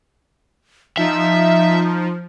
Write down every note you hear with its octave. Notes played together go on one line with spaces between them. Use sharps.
F3 D#4 E5